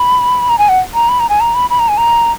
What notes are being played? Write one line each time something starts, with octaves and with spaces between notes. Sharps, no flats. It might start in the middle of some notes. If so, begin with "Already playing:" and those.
Already playing: B5
A#5
G#5
F#5
A#5
B5
A#5
G#5
A#5
B5
B5
A#5
G#5
A#5